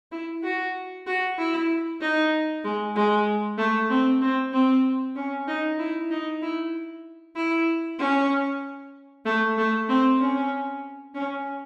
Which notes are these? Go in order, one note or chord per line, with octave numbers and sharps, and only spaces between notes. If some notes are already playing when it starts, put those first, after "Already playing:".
E4
F#4
F#4
E4
D#4
G#3
G#3
A3
C4
C4
C4
C#4
D#4
E4
D#4
E4
E4
C#4
A3
A3
C4
C#4
C#4